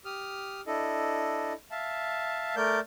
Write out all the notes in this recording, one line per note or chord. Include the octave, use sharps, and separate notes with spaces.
G4 D#6 F6
D4 E4 A4 D#5
E5 F5 A5
A3 A#4 D5 G6